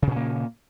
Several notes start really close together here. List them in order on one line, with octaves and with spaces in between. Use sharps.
C#3 A#2 C#4 A#3